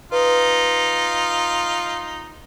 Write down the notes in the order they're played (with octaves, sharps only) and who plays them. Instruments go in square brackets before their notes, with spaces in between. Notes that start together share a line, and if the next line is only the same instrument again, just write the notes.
[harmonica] D#4 F4 [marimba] B4